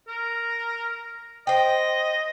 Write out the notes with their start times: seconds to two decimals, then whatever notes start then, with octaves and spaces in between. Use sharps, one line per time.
0.08 A#4
1.47 C5 D#5 G5